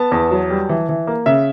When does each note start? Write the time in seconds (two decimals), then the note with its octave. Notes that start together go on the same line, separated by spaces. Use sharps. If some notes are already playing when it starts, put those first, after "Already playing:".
Already playing: B3 A5
0.12 E2
0.31 F#3
0.50 G3
0.69 E3
0.89 E3
1.07 A#3
1.26 C#3 E5